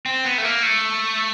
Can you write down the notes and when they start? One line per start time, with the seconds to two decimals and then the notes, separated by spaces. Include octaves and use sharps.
0.06 C4
0.25 B3
0.38 A3
0.44 A#3
0.63 A3